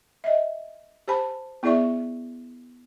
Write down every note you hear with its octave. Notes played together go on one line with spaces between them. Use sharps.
D#5 E5
G4 C5 G#5 A5 B5
B3 E4 G#4 D5 E5 C#6